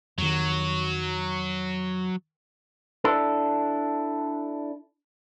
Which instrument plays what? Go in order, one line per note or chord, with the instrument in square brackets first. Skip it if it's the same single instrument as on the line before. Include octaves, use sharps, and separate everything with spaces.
[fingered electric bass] F2 D#3 [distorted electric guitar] F#3
[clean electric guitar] D4 E4 A4